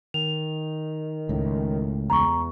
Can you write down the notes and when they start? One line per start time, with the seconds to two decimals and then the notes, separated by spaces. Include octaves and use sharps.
0.14 D#3 F7
1.29 C#2 A2
2.10 E2 A#5 C#6